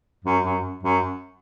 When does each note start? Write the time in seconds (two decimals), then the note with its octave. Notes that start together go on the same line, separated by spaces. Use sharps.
0.25 F#2
0.44 F#2
0.83 F#2